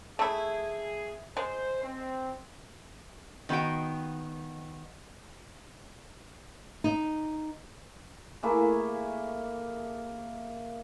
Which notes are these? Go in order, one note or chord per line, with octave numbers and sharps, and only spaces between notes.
A3 E4 G#4
G#3 C5
C4
D#3 B3 D#4 F#4 G5
D#4
A3 A#3 E4 G#4